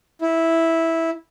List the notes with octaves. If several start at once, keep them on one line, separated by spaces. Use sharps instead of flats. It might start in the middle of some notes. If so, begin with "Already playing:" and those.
E4